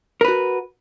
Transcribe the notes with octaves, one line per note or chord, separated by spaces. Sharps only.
F#4 A#4 B4